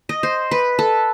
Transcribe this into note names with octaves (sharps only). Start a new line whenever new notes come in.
D#5
C5
B4
A4